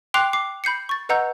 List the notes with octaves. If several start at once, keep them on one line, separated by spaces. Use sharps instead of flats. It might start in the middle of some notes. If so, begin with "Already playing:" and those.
G5 C6 D6 F#6 C7 F7
D6 C7
B5 G6 C7 C#7
C#6 A6
B4 D#5 F#5 A#5 E6 G6